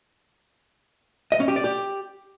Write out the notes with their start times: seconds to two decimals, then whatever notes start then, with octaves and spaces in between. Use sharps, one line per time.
1.32 D#5
1.40 C#4
1.48 G4
1.56 D5
1.64 G4